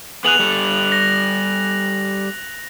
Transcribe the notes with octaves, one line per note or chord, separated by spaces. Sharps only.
B3 G#4 F#6 F7 F#7
G3 A4
A#6